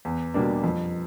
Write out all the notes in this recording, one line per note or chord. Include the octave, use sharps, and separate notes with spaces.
E2
B2 G3 A#3 D4
F2